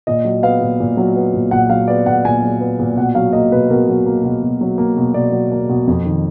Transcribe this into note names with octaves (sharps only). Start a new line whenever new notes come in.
A#2 D#5
F#3
B3 F5
A#2
A#2
F#3
B3
A#2
A#2 F#5
F#3 F5
B3 D5
A#2 F#5
A#2 G#5
F#3
B3
A#2
B2 F#5
F#3 F5
A#3 D#5
B2 B4
B2 A#4
F#3
A#3
B2
B2
F#3
A#3
B2
B2 D5
F#3
A#3
B2
F2
D#3